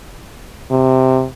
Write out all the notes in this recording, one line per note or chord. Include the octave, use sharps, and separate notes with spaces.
C3